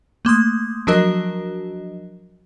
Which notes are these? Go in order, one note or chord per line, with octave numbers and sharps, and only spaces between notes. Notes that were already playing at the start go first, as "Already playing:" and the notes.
A3 A#3 C6 D#6
F3 F#3 D4 F#4 A#4 D#5